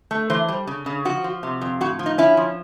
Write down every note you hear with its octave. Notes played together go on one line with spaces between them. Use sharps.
A3
E3 C5
G3
C#3
C#3
F3 F#4
F3
C3
F2
A2 F#4
F3
D#4
C#4 E4
F3